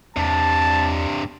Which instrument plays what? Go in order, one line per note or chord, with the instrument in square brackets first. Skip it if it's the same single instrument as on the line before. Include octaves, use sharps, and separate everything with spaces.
[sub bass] E2 [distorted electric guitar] G2 C3 [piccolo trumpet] A5